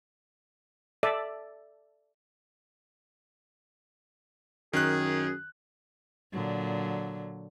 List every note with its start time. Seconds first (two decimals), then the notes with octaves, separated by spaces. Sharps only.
1.03 A4 D5 E5
4.73 F#2 D#3 G#4 F#6
6.32 A#2 D3 F#3